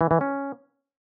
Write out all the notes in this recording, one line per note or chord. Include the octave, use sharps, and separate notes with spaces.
E3
E3
C#4